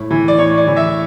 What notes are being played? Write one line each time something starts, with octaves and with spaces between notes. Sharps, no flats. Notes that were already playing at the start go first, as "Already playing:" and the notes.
Already playing: A2
E3
D5
A2 C#5
D5
E3
E5